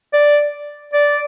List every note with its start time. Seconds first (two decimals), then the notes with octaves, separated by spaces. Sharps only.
0.13 D5
0.93 D5